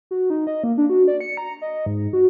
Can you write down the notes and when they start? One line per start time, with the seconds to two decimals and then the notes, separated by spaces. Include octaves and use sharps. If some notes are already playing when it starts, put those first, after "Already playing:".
0.11 F#4
0.30 D#4
0.47 D#5
0.64 A#3
0.78 D4
0.90 F#4
1.08 D5
1.21 C#7
1.37 A#5
1.62 D#5
1.86 G#2
2.13 F#4